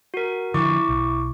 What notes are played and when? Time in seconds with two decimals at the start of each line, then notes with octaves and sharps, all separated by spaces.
0.14 F#4 A#4
0.54 D3 F3 E4 C#6 D6
0.89 B1